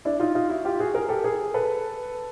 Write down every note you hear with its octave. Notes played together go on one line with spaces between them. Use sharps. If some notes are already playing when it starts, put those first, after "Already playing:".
D4 E4
D#4 F4
D#4 F4
E4 F#4
F4 G4
F#4 G#4
G#4 A#4
G4 A4
G#4 A#4
A4 B4